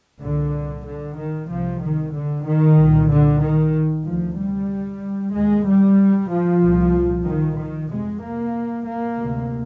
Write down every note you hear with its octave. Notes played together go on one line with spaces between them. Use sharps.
C2 A#2 D3
D3
D#3
C2 C3 F3
D#3
D3
D#3
C2 A#2
D3
D#3
D2 C3 F3
G3
D#2 G#3
G3
F3
C2 A#2
D#3
D#3
F2 C3 G#3
A#3
A#3
D2 C3